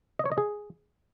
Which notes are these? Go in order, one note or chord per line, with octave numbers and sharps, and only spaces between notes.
D#5
C#5
D#5
G#4